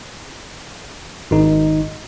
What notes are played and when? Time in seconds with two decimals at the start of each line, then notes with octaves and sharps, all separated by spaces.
1.31 G#1 D#4